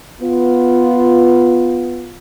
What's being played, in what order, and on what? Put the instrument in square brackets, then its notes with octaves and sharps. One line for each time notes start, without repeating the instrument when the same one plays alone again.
[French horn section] B3 F4